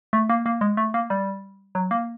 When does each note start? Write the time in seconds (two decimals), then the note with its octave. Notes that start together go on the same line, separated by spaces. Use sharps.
0.13 A3
0.29 A#3
0.46 A#3
0.61 G#3
0.77 A3
0.94 A#3
1.10 G3
1.75 F#3
1.91 A#3